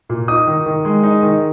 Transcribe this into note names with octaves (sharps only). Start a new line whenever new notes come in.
A#2
D#4 D#6
D#3
D#3
G#3
D#4
D#3